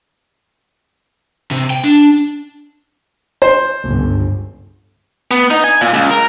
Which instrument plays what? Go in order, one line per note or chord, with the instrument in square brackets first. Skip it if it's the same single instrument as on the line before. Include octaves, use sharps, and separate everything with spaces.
[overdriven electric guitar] C3
G5
D4
[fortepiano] C5
[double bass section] G1 C#2
[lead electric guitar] B3
D#4
G#5
A#2
C#2
A#4